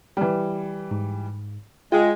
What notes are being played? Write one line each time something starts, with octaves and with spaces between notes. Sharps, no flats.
E3 G3
G#2
G#3 F4 G5